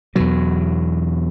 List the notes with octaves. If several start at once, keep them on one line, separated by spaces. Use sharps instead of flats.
E2 B2 F#3